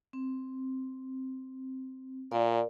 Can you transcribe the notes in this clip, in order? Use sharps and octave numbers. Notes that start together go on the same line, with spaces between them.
C4
A#2 A#4 D5 F5